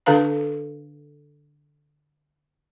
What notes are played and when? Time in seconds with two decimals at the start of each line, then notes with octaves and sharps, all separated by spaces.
0.06 D3 D4 A4 B4 F5 A#5